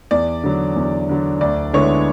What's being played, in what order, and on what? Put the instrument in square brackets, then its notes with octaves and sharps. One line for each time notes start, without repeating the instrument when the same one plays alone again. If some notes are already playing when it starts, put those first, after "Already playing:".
[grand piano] E2 [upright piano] D5
[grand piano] D3 F#3
E2
D3 F#3
[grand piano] D2 [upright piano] D5
[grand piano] D3 G#3 B3 E4 [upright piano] C#5